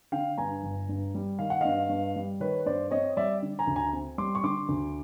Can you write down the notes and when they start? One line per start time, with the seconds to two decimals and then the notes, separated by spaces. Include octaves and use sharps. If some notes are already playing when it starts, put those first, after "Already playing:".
0.12 D3 F5 G5
0.38 G2 G#5 A#5
0.63 G1
0.89 G2
1.15 G3
1.39 D#3 F5
1.50 F#5
1.61 G2 D#5 F5
1.89 G2
2.16 G3
2.40 D#3 B4 C#5
2.66 G2 C5 D5
2.91 C4 C#5 D#5
3.17 G3 D5 E5
3.42 D3
3.59 G#5 A#5
3.67 D2
3.76 G#5 A#5
3.93 C4
4.18 G3 C6 D6
4.35 C#6
4.44 D3 C6 D6
4.68 D2